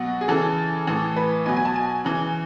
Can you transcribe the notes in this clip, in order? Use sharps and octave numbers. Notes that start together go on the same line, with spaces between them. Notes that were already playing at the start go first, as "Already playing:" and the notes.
Already playing: B2 F#3 F#4
G#4
C#3 E3 A4
A2 E3
B4
B2 F#3 G#5
G#5
A5
G#5
C#3 E3